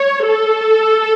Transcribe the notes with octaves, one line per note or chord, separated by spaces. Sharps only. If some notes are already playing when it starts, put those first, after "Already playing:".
Already playing: C#5
A4